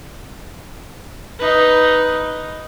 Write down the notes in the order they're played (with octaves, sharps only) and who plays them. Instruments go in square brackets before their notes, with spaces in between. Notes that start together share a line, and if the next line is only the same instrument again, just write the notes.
[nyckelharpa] D#4 B4